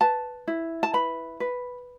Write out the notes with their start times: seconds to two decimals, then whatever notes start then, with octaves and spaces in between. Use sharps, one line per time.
0.01 B4 A5
0.48 E4
0.83 A5
0.93 B4 B5
1.40 B4